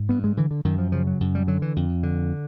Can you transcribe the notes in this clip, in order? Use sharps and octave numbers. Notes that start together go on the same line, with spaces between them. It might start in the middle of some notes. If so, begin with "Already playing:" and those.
Already playing: G#2
G2 B3
G#3
D3 E3
D3
F#2 D#3
F3
C#3 F3
F#3
F#2
G3
D3 F#3
E3
F2
D3